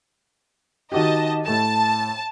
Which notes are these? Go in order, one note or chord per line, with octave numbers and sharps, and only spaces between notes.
D#3 F#4 G4 D#5 A5
A2 A3 A5 E7